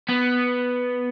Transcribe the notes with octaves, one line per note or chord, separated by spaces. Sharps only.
B3